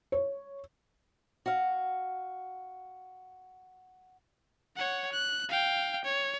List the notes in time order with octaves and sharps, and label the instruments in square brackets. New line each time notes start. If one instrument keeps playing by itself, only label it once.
[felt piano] C#5
[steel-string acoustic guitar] F#4 F5
[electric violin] C#5 F#5
F#6
F5 G5
C#5